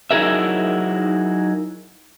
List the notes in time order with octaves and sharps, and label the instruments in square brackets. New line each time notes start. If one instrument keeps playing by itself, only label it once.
[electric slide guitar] F#3 D#4 E4 G#4 A#4 E5